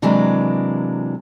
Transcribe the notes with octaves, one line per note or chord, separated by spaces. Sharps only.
C3 E3 F#3 G#3 A#3 D4